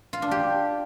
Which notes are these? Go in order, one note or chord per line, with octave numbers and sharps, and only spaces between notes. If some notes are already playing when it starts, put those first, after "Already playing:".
F4
D4
G4